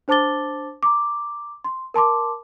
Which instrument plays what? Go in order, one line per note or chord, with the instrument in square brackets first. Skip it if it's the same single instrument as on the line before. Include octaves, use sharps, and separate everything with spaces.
[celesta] D4 C5 A5 D6 A6 G7
A#5 D6
C6
A#4 A5 C6 D6